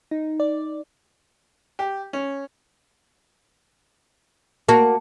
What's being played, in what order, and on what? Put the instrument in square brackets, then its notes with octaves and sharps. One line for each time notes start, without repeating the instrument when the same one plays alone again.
[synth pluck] D#4
D5
[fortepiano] G4
C#4
[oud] A#3 F#4 [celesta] A5